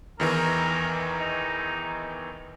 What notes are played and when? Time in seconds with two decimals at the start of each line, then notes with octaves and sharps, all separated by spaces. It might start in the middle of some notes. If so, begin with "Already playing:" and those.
0.20 E2 D#3 E3 A#4
1.20 D#4